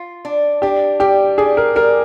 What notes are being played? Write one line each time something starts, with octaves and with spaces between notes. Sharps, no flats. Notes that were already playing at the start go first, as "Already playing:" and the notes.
Already playing: F4
D4
D4 G4
G3 G4
D4 G#4
A#4
G3 A#4